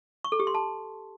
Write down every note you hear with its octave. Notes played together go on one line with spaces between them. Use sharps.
C#6
A4
G4
C6
A5